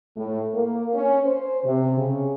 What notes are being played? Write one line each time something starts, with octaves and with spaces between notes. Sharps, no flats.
A2
A#3
C#4
C5
C3
C#3